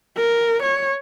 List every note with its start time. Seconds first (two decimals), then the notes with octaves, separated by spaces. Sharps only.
0.17 A#4
0.63 C#5